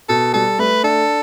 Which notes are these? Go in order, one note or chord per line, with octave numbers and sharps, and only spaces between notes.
B2 A4
G3 A4
A3 B4
D4 A4